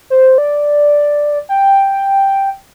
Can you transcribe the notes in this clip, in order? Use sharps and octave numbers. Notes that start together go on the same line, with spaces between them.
C5
D5
G5